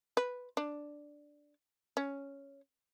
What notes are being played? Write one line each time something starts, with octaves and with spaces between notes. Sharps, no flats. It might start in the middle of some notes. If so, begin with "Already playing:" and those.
B4
D4
C#4